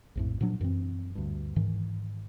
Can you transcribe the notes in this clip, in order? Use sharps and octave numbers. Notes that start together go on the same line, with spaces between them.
A#1 F2 A2
A#2 F3 F#3 D4
F#2 E3 C4
D2 G2
G#2 D#3 E3